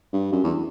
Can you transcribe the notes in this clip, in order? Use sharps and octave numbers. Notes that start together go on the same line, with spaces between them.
G2
F#2
E2